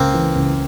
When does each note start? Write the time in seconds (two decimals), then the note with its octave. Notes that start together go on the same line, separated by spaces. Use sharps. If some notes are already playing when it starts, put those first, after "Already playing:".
Already playing: C#2 A#3 C4
0.14 E3
0.36 C#2